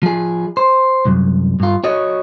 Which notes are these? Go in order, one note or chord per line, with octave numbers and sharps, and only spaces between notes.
F3 G#4
C5
C2 F#2
G2 F4
F#4 C#5 D#5